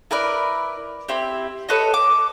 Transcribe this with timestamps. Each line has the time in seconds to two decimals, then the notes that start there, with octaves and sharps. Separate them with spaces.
0.11 E4 A#4 B4 D5
1.08 C4 E4 G4
1.69 A4 B4 C#5 D#5
1.94 D6